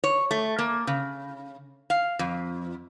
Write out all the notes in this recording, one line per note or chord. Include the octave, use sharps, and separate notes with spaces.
C#5
A3
A#3
C#3
F5
F2